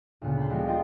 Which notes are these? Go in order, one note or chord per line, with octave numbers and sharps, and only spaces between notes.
D2 A#2 C#3 B3
C5 A5 B5
F3 G3 G#3 B3 C4 E4
G#3 F4 D#5 G5 C6 A6